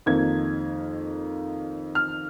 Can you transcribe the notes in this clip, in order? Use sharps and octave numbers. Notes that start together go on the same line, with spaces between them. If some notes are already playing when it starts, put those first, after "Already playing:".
F2 D#3 A#3 G#6
F6